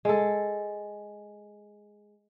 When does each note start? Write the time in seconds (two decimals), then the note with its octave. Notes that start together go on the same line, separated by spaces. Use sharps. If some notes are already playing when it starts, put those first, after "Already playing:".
0.05 G#3 A4